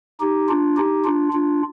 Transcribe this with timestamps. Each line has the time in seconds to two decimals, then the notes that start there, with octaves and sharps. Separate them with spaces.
0.21 D#4 G4
0.49 D4 F4
0.77 D#4 G4
1.05 D4 F4
1.33 D4 F4